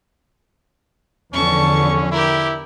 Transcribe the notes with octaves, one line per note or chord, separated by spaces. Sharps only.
E2 D3 F3 C#4 A5 C#6
E4 G4 A#4